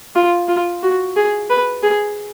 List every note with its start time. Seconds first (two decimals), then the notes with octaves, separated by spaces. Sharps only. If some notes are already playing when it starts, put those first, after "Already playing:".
0.15 F4
0.48 F4
0.83 F#4
1.16 G#4
1.50 B4
1.83 G#4